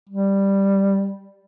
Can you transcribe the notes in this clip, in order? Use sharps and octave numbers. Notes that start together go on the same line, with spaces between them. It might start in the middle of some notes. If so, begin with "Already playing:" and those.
G3